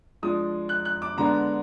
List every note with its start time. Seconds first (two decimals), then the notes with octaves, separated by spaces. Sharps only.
0.22 F3 G#3 D4 D#6
0.69 F#6
0.85 F#6
1.02 D6
1.17 D3 G#3 B3 D4 A#5